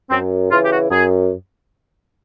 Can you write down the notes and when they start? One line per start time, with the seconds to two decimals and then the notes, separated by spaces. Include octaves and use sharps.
0.09 F#2 C4
0.50 C#3 E3 F4
0.63 G4
0.70 F#4
0.90 F#2 G#4